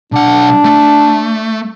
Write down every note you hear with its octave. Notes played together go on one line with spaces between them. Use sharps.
B1 D4 F#5
A3